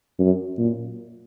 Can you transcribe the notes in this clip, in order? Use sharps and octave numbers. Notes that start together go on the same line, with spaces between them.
F#2
A#2